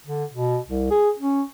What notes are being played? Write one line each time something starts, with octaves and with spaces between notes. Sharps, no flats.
D3
B2
C2
G#4
C#4